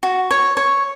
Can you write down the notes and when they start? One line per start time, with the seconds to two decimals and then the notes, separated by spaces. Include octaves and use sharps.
0.03 F#4
0.31 C#5
0.57 C#5